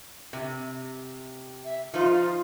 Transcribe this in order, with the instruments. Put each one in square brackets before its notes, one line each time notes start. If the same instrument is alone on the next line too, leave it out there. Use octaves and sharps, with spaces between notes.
[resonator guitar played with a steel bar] C3
[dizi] E5
[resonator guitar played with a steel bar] F3 D#4 C5 [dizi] F4